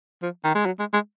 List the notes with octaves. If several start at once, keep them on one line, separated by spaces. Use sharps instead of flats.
F3
D#3
G#3
F#3
G#3
G#3